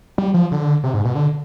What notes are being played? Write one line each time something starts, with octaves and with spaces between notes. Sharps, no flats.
G3
F3
D3
C3
G#2
B2
D3